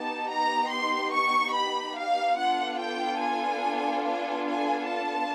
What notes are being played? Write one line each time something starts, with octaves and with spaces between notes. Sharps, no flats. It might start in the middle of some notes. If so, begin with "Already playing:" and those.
Already playing: B3 D#4 G4 A5
A#5
C6
C#6
B5
F5
B3 D4 F4 A4 F#5
G5
G#5
G#5
G#5
A5